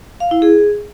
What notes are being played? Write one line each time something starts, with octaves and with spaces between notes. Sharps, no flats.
F5
E4
G#4